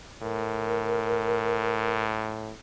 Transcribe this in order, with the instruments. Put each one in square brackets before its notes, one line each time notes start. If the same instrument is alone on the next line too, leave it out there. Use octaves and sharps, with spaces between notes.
[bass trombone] A2 [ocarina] A#4